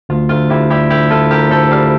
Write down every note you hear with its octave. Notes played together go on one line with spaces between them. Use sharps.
D2 F4
D2 F4
D2 E4 G4
G3 E4 G4
D2 E4 G4
D2 F4 A4
D2 G4 A#4
D2 A4 C5
G3 D5 F5